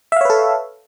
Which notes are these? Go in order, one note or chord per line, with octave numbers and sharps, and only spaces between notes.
A4 B4 C#5 E5 F5